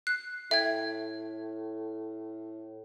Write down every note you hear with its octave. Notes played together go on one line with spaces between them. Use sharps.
F#6 C7
A2 E5 G5 G#6